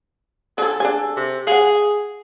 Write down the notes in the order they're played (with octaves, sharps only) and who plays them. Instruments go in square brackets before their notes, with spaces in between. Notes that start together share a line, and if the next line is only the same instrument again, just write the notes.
[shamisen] D3 G#4 [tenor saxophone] A4
[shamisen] D4 G#4 G#5
[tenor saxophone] C3
[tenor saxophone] G#4 [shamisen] F5 F#5